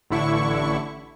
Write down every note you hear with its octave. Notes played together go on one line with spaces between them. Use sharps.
A1 D3 E4 C#6